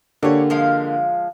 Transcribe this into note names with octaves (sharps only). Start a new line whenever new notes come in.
D3 A#3 G4 C#5 D5
F3 G#3 F5